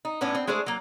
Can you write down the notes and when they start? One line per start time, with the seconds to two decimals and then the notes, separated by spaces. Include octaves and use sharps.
0.05 D#4
0.21 A2 B3 C#4 D4
0.35 C4
0.47 G#3 A3 D4 G#4 C5
0.66 F#3 A#3